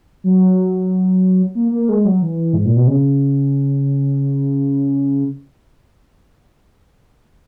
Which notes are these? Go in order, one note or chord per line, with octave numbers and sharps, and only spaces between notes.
F#3
A#3
A#3
G#3
F#3
E3
G#2
A#2
B2
C#3